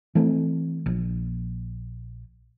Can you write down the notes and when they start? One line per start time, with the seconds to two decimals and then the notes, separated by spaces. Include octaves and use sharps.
0.15 E3 A3 C4
0.86 A#1